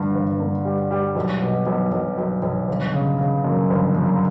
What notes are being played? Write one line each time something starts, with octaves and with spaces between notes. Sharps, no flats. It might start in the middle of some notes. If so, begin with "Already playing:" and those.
Already playing: G2 D3
G1
G2
G3
G3
B1
B2
B1
B1
B1
B1
G1
C#3
C#3
F#2
G1
F#2